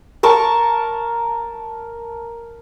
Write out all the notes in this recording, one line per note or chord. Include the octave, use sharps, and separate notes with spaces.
A#4 A5 C#6